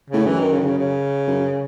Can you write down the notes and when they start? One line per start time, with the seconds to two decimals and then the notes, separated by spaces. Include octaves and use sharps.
0.10 A2 C#3
0.26 F#2 E3
0.39 D#3
0.53 C#3
0.59 D#3
0.65 C#3
0.78 C#3
1.28 F#2